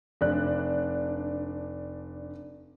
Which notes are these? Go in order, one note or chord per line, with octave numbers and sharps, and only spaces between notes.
F1 D4 D5 F#6